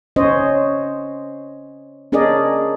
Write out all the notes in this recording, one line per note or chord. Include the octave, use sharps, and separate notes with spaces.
C#4 C5 C#5 D#5
C#4 D4 G#4 A#4 D5 D#5